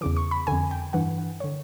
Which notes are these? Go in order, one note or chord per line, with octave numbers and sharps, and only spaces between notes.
E2 C#3 E3 D6
C#6
B5
F2 D3 G#5
G5
G2 E3 F#5
D3 C#5